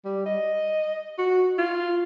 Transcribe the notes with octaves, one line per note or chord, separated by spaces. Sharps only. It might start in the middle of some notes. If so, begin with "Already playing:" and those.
G3
D#5
F#4
F4